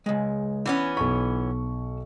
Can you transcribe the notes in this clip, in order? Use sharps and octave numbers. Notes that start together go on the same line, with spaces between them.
C#2 G#3
E3 B3 C#4
B1 B5 C#6